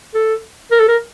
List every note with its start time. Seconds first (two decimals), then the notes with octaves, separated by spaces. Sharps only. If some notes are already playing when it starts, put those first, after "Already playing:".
0.14 A4
0.71 A#4
0.80 A4
0.88 A#4